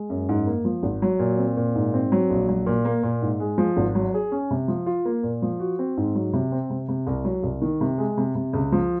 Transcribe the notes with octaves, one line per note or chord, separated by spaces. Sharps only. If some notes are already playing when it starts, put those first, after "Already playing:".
Already playing: G#3
F#2
G#2
A#3
F3
G#1
F#3
A#2
C4
A#2
G#2
C4
F#3
A#1
F#3
A#2
A#3
A#2
G#2
G#3
F3
G#1
F#3
G#4
C#4
C3
F3
F4
A#3
A#2
F3
F#4
C4
G#2
F#3
C3
C4
C3
C3
C2
F#3
C2
D#3
C3
G#3
C3
C3
C#2
F3